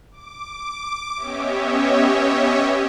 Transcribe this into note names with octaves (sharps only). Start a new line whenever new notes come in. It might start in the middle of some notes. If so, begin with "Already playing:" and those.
D6
B3 C#4 G4 C#5 D#5 E5